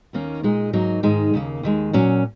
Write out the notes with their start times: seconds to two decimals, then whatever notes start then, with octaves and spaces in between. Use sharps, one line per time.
0.13 D#2 D#3 A#3 C#4
0.43 A#2 G#3 D#4
0.73 G#2 F#3 A#3 D#4
1.03 G#2 D#3 G#3 D#4
1.33 D#2 C#3 A#3
1.63 D#2 D#3 G#3
1.93 A#2 F#3 C#4